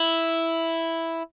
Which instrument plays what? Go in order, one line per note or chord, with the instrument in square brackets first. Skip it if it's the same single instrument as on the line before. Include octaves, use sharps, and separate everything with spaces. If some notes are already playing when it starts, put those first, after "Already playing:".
Already playing: [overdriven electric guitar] E4